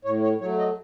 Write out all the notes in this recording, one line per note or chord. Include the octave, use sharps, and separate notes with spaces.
A2 C#5
C#5
F#3 A3 C#5
D#5